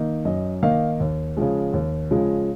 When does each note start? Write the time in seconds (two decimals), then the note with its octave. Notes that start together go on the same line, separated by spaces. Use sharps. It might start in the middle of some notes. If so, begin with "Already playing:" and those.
Already playing: D#3 A#3 D#4
0.25 F#2 D#5
0.63 D#3 A#3 D#4 F5
1.00 D#2
1.37 C#3 F3 G#3
1.73 D#2
2.11 C#3 F3 G#3